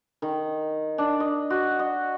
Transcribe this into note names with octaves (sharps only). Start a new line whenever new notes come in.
D#3
D4
D#5
F#4
D#5